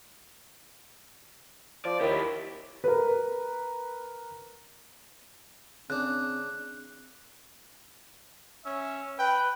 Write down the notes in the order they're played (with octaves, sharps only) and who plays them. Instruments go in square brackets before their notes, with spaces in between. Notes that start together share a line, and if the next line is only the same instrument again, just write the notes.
[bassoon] F3 [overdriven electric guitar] D5
[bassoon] D#2 [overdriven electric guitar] E4 G4
[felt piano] A#4 B4
[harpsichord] C#3 D4 [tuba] C4 [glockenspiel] F#6
[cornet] C#4 [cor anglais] E5
[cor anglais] B4 [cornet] G5